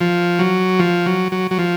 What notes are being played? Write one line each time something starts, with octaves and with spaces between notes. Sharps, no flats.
F3
F#3
F3
F#3
F#3
F#3
F3